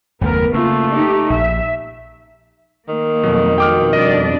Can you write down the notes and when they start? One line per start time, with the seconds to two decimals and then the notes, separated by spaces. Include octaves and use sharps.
0.21 F#1 D#2 A3 B3 A#4
0.54 C#3 A3 A#3 F4
0.89 D#4 G4
1.30 A#1 E5
2.89 D#3 A#3
3.23 F2 B2 F#3
3.58 G5 D6 F6
3.93 G3 D4 D5 D#5